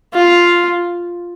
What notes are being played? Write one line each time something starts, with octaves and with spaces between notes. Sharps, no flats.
F4